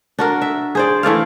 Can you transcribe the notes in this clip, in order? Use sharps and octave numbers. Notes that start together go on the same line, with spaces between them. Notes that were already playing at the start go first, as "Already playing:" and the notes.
D4 F#4 A#4
E5
G#4 C5 D5
E3 A3 D5 F5